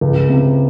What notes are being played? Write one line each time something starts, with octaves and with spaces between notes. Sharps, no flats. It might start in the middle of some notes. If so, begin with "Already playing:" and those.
C#2
C3